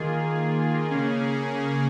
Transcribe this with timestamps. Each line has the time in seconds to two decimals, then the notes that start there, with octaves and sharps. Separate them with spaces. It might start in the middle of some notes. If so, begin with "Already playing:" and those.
Already playing: D#3 A#3 F4 G#4
0.35 G#4
0.90 C#3 A#3 C#4